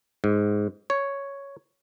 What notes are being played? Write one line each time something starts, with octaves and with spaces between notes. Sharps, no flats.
G#2
C#5